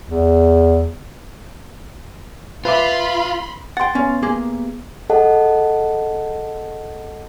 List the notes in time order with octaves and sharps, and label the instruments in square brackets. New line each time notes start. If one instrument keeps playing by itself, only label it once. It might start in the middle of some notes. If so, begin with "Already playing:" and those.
[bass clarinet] E2
[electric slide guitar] F4 [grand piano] B4 E5 D6 [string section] B5 C6
[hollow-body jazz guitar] F#5 G5 [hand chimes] C6 A6
[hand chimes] B3 [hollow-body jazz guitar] C#4
[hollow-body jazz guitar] A#3 G4 G#4
[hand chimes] G#4 A4 D#5 F#5 A5